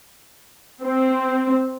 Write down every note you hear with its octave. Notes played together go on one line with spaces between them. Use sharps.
C4